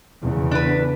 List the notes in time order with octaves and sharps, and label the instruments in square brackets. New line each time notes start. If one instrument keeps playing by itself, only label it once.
[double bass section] E2 C#3
[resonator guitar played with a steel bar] D4 B4